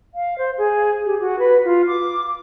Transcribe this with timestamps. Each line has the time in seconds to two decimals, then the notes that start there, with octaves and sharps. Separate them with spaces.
0.14 F5
0.38 C5
0.58 G#4
1.05 G4
1.21 F#4
1.39 B4
1.65 F4
1.87 D6